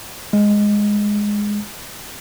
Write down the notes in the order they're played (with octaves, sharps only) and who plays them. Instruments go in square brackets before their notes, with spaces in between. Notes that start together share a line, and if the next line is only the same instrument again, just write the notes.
[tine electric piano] G#3